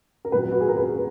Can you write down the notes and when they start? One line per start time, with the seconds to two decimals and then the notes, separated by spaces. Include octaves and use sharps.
0.25 A#4
0.32 A#2 F#3 B4
0.52 F#4
0.61 G#4
0.68 A#4
0.77 B4